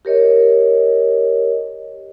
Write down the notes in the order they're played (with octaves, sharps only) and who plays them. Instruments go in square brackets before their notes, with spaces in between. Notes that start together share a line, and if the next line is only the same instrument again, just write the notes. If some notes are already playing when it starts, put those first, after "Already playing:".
[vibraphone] G4 A#4 C#5 D#5